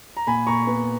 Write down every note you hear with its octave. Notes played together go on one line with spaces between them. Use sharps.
A#5
A#2 G#5 B5
A#2 A#5 C#6
B3